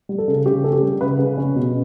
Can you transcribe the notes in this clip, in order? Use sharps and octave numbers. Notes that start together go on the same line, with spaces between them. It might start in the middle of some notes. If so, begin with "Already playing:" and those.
G3
A4
C#3
C#3 G4
C#4 A4
G4
G3
C#3 B4
C#3
C#4
B2